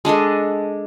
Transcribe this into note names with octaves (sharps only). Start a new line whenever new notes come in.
G#3 D4 A4 D#5